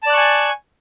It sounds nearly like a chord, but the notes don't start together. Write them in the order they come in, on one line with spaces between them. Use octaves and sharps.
A5 D5 F#6 C#6 G#5